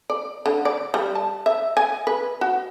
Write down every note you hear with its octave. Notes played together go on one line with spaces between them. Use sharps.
D5
D3
D5
G3
A5
E5
G#5
B4
F#4